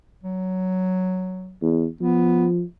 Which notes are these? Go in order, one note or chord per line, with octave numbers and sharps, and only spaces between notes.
F#3
E2
F3 B3